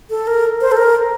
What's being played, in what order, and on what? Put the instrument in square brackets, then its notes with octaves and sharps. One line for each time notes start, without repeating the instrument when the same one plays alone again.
[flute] A4
A#4
C5
A4
A#4